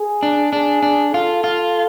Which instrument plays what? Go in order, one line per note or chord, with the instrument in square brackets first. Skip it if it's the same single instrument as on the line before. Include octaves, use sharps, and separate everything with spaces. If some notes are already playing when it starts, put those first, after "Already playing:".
Already playing: [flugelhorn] G#4
[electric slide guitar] D4
[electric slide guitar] D4 [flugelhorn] G#4
[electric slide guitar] D4
[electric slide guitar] F4 [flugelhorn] A4
[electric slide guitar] F4